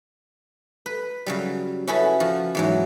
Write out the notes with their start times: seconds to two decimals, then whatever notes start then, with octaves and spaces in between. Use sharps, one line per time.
0.86 B4
1.26 C#3 F#3 G3
1.87 C#4 E4 F#4 G#4 A4 B4
2.20 F3 F#4
2.55 E2 G#2 F#3